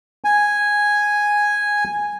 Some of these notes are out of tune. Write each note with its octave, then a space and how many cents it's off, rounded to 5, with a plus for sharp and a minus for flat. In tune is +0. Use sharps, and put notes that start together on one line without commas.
G#5 -5